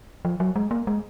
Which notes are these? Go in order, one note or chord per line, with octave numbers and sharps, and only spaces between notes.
F3
F#3
G#3
A#3
G#3